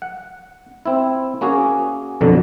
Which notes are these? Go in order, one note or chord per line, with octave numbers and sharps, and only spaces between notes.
F#5
C4 E4
A#3 C#4 F#4 G#4
F2 B2 D3 F#3